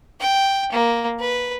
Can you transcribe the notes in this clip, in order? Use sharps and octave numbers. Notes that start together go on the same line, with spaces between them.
G5
A#3
B4